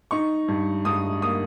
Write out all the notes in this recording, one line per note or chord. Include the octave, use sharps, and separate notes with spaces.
D#4 C#6
G2
G2 D#6
A#3 D#6